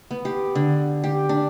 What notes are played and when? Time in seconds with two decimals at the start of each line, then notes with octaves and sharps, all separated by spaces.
0.11 B3
0.25 G4
0.55 D3
1.04 G4
1.29 D4